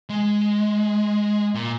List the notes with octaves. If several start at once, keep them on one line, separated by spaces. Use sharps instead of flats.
G#3
A#2